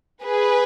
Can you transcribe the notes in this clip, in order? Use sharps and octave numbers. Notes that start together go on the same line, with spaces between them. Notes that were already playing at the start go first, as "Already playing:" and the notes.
G#4 B4